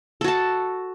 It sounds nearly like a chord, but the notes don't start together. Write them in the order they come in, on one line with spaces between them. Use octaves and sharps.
A4 F#4 A5